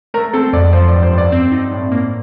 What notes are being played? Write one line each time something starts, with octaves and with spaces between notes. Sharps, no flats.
A3 A#4
C4 A4
F2 D5
F3 C5
D5
G2
C5
G2
D5
C4
D#4
A2
A#3